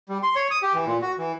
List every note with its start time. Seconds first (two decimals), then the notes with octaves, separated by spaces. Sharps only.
0.09 G3
0.23 C6
0.36 C#5
0.51 D#6
0.62 G4
0.74 E3
0.87 A#2
1.02 F#4
1.18 E3